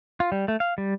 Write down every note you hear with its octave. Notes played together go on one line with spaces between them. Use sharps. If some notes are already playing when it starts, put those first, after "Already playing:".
F4
G3
A3
F5
G3